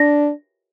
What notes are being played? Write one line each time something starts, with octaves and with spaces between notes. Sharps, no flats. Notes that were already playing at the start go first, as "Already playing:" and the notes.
Already playing: D4 A#6